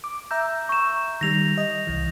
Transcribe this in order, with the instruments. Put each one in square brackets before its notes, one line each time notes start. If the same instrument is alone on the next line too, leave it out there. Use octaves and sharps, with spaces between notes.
[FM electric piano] D6
[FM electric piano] E5 A#5 E6 [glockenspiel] G6
[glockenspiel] C#6 E7
[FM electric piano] D#3 G3 [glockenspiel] A#6 F7
[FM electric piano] D#5
C2 E3